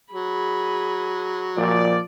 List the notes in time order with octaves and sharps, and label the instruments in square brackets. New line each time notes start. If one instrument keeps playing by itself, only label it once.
[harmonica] F#3 [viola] G#4 B5
[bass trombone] A#2 [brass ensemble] F3 D5